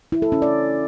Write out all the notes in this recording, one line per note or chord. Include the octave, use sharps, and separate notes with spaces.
E4
A4
C#4
D5